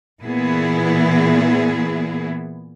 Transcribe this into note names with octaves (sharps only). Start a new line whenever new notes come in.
A#2 E3 B3 E4 G#4